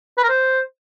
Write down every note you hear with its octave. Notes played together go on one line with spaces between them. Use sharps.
B4
A#4
C5